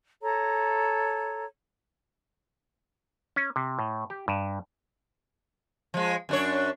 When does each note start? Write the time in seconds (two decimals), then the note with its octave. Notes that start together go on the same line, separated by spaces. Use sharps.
0.22 A4 C#5 A#5
3.36 C#4
3.56 C3
3.79 A2
4.10 G4
4.28 G2
5.94 F3 G#3
6.29 F#2 D4 C#5